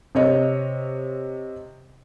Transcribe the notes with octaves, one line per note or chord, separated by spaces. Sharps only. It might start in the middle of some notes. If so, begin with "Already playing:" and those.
C3 C#5 D#5